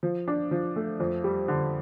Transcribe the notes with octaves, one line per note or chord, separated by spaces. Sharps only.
F3
D4
F3
A3
F2
G3
D3